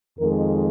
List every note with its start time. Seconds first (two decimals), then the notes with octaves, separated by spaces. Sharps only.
0.18 F2 D#3 G#3 A#4